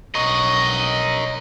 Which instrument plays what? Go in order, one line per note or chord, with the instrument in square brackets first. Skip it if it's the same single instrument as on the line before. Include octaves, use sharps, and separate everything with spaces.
[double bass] B1 [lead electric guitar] A#4 C#5 [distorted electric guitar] D#5